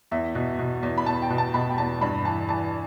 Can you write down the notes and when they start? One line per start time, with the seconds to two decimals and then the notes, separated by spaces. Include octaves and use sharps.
0.11 E2 E5
0.35 B2
0.59 B2
0.83 E2
0.98 B5
1.06 E2 A5
1.22 G5
1.30 B2
1.38 A5
1.54 B2 B5
1.69 G5
1.78 E2 A5
2.01 G2 B5
2.25 E3 A5
2.49 E3 A5